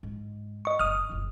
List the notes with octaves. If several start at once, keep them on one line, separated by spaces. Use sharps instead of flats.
G#2
D#5 C#6
F#1 D#6 F6
F#1 F4